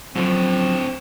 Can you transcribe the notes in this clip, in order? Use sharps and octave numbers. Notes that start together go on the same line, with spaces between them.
F#2 A2 D3 F3 F#3 C4